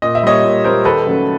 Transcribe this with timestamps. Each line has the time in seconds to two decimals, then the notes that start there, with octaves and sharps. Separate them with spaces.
0.02 A#2 D#5
0.15 E5
0.23 G3 A#3 C#5 D#5
0.44 A#2
0.64 G3 A#3 A#4 C5
0.85 D#2 A4 B4
1.06 C#3 F#3 A3